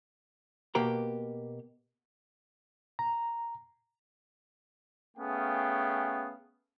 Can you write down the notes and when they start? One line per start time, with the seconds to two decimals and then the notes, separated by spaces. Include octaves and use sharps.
0.75 B2 A#3 F#4 G4 A#5
2.99 A#5
5.17 A3 B3 C#4 G#4 F5 G5